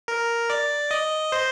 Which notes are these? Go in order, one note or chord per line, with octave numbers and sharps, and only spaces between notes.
A#4
D5
D#5
C5